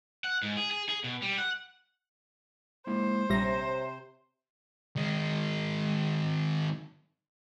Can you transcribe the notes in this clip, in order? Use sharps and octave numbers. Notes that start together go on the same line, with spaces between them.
F#5
G#2
G#4
G#4
G#4
B2
G3
F#5
G#3 A#3 E4 C5
A#1 C3 G3 C#5 E5 A#5 A#6
D#3 G#3